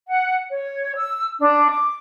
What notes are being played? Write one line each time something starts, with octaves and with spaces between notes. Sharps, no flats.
F#5
C#5
E6
D4
D6